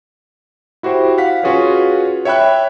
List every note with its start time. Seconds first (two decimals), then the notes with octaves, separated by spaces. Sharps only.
0.83 E4 F#4 G4 C5 G5
1.18 F5 F#5 B6
1.43 C#4 F4 F#4 G#4 B4 C#5
2.25 C#5 E5 G5 B5 F#6